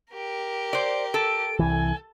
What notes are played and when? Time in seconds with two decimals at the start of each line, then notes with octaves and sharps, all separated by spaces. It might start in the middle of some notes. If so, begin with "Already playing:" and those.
0.13 G4 A#4
0.73 C5 D5
1.14 A4 D7
1.59 C2 E3 G#5